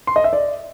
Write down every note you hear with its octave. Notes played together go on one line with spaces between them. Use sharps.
C6
D#5
E5
D5